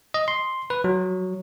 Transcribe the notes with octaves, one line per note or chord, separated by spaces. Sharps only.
D#5
C6
B4
F#3